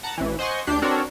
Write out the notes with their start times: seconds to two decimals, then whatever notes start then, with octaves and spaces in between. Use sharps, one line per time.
0.03 F#5 A5 A#5
0.18 A1 E3
0.39 C5 D#5 F#5 G#5 C6 C#6
0.67 D2 D4 G4 G6 C7
0.82 C4 D4 F#4 A4 A#4 C#5